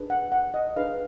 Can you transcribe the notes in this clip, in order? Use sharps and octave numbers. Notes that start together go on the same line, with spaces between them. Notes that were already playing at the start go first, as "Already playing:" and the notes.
Already playing: D4 G#4 B4
F#5
F#5
D#5
D4 G#4 B4 F5